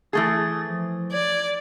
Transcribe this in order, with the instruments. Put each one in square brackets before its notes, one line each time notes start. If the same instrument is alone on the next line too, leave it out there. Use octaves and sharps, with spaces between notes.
[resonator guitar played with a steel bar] E3 A3 G#4 [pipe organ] D#6 A6
[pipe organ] F3
[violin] D5 [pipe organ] G#6